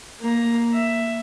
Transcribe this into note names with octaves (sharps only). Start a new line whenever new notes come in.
A#3 A#5
E5